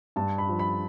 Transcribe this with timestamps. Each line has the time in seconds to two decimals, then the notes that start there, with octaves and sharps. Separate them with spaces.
0.16 G2 A5
0.38 B5
0.49 F3
0.59 B5